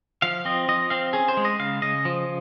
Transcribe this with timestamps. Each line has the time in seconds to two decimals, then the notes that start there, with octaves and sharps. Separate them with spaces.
0.22 F3 F5
0.45 C4 D#5
0.69 F3 D#5
0.90 C4 F5
1.13 C#4 G#4
1.28 C5
1.37 G#3
1.45 D#5
1.59 C#3 F5
1.82 C#3 D#5
2.05 F3